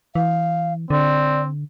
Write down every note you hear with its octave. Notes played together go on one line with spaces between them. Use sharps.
E3 F5
D3 C4 D5